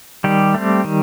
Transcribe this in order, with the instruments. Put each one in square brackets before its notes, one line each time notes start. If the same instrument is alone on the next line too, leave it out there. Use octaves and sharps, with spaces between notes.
[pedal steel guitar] D#3 G3 G4
A3 C4
D#3